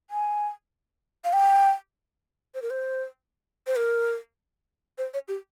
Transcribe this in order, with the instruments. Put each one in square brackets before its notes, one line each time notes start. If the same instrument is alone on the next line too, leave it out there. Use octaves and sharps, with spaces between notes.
[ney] G#5
F5
G5
C5
A#4
C5
C5
A#4
C5
C#5
G4